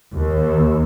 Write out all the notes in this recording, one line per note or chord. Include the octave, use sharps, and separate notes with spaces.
D#2